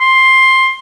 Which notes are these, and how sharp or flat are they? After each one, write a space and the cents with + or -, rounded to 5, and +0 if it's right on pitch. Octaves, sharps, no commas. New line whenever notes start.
C6 +10